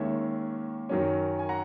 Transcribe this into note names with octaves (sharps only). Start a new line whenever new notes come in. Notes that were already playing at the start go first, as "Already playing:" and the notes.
Already playing: D#2 D#3 G#3 C#4 C#5 E5
F#2 D#3 F#3 C#4
G#5
F#5 A#5